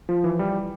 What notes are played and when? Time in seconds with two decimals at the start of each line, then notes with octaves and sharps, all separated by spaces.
0.09 F3
0.24 E3
0.39 G3